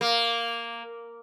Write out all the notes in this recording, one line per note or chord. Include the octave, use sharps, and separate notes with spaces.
A#3